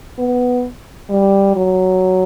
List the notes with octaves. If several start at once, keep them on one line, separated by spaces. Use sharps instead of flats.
B3
G3
F#3